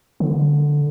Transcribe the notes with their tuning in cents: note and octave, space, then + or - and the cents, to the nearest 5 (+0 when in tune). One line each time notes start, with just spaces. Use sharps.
D3 +0